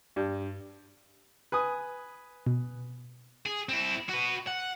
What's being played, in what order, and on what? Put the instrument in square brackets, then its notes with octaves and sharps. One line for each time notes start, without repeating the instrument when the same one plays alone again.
[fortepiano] G2
B4 G#5 D#6
[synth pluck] B2
[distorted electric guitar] G#4
C4 E4
F#4 B4
F#5